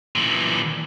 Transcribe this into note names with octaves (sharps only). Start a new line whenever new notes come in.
A#2 E3